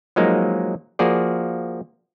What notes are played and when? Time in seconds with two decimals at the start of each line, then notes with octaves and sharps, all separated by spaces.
0.16 F3 F#3 G#3 A#3 D#4
0.99 F3 A#3 F#4 G#4 D5